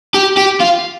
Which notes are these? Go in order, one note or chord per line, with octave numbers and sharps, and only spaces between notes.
G4
G4
F4